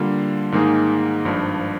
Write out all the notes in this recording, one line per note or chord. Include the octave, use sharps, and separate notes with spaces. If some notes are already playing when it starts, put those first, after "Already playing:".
Already playing: D3 G3 A#3 F4
G#2 D#3 A#3 D#4 G#4
G#1 G2 F3